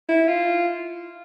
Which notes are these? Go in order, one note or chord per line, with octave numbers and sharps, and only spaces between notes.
E4
F4